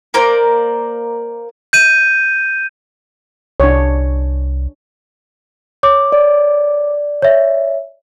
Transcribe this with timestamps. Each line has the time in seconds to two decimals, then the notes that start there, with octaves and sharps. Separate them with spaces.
0.14 A#3 A#4 C5 D5
1.73 G6 D#7
3.60 C2 D4 C#5
5.83 C#5 D6
6.12 D5
7.22 C#5 E5